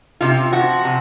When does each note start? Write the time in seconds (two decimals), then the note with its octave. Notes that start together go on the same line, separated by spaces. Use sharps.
0.21 C3 F4
0.52 F3 F#4
0.84 C3